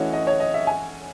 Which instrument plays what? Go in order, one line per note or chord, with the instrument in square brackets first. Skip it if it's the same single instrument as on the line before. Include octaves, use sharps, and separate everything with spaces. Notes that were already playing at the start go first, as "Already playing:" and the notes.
Already playing: [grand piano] E3 A3 C#4 F#4 [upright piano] C#5 D#5
[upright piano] D#5
C#5
D#5
E5
G#5